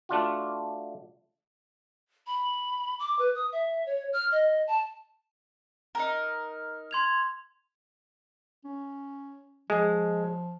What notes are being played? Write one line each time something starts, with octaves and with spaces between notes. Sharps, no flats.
A3 D4 F4 F#4
B5
D6
B4
D#6
E5
C#5
F6
D#5
A5
D#4 A#4
C6 G#6 F7
C#4
F3 G#3